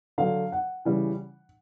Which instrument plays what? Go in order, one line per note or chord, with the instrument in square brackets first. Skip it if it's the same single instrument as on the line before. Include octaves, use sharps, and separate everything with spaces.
[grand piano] D3 F#3 F5
F#5
C#3 E3 G3